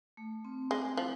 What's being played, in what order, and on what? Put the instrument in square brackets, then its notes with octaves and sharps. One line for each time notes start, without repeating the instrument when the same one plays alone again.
[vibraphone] A3
C4
[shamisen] G#3 [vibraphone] C4
[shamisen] F3 [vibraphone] E4